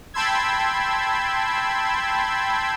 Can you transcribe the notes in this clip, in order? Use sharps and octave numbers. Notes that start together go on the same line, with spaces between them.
G5 A5 B5 C6 E6 G#6